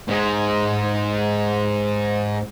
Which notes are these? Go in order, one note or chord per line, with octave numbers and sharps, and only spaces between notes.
G#2 G#3